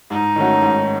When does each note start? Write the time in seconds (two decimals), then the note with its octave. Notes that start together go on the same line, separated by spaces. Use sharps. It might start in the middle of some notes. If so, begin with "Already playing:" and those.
0.10 G#2 D#4
0.36 D#3 A3 C#4 F#4
0.62 G#2